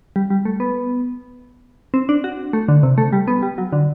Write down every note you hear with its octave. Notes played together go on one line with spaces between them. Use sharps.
G3
G3
A3
B3
C4
D4
F#4
A3
D3
C3
A3
G3
B3
G3
F#3
D3